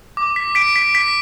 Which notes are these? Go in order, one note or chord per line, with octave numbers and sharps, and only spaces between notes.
D6
B6
B6 D7
B6
B6